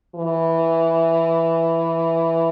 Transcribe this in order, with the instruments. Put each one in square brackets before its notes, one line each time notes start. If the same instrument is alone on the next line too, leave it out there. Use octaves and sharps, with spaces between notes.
[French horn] E3